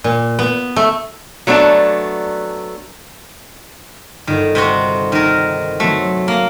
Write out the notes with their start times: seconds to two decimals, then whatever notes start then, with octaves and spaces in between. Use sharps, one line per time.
0.04 A#2
0.39 B3
0.76 A3
1.47 F#3 A3 B3 D4
4.27 G1 D#3
4.55 C3 C4 F#4
5.12 D#3 A#4
5.80 F#3 A3 C4 F#4
6.28 A#3